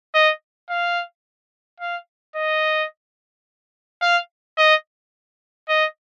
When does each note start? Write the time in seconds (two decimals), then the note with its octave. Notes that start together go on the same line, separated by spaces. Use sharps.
0.14 D#5
0.70 F5
1.80 F5
2.35 D#5
4.02 F5
4.58 D#5
5.69 D#5